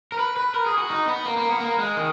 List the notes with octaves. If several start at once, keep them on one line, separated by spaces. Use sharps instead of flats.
A#4
B4
B4
A#4
G#4
F#4
D#4
B3
A#3
A#3
B3
A#3
G#3
D#3